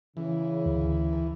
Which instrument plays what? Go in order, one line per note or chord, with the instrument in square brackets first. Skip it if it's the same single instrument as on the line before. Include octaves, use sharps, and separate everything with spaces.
[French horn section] C#3 [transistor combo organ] E3
[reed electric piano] D2